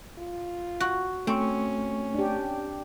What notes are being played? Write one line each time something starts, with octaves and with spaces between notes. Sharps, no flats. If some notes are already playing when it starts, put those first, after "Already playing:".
F4
F#4
A3 C4 C#4 C#6
D4 G4